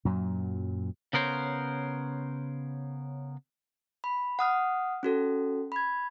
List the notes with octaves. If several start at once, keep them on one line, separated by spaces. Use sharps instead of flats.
F#2 A#2 F#3
C#3 B3 A#4 C5 C#5
B5
F#5 D#6 F6
C#4 F#4 A4
B5 G#6